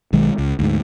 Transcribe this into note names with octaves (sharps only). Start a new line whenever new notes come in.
B1 D#3 G#3
C#2
D2 G#2